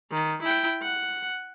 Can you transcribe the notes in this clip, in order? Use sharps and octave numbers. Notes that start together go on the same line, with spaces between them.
D#3
E4 G5
F#5